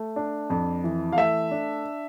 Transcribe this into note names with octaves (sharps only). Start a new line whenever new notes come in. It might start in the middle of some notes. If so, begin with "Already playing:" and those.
Already playing: A3
D4
F2
E3
F5
A3 E5
D4